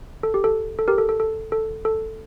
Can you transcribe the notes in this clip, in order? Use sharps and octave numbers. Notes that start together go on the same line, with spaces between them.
A4
G4
A4
A4
G4 A#4
A4
A4
A4
A4
A4